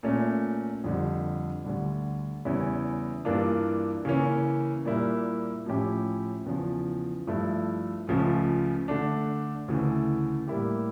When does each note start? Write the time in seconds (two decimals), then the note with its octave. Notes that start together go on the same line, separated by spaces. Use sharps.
0.03 A#2 A3 C#4
0.84 F2 D3 G3
1.64 D2 D3 G3
2.45 E2 C#3 G3 C#4 E4
3.25 G2 E3 A#3 D4 F4
4.05 C#3 E3 A#3 C#4
4.85 A#2 G3 A#3 E4
5.66 A2 F3 C#4 E4 G4
6.46 E2 C#3 F3
7.27 G2 F3 A3 E4
8.07 C#2 C#3 F3 A3
8.88 D3 A3 D4
9.68 D2 C#3 E3 A3
10.48 A2 G3 A#3 E4 G4